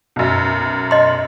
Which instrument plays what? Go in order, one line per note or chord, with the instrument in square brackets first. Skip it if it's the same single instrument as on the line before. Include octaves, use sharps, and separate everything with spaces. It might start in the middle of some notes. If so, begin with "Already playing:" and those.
[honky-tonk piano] B1 F#2
[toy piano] D#5 C6